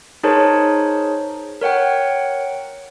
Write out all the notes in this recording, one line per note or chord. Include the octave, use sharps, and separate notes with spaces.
D#4 G#4 A#4 C5 C#5 A5
A#4 C#5 F#5 G5